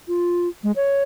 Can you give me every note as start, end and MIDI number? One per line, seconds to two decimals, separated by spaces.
0.08 0.48 65
0.64 0.72 56
0.76 1.03 73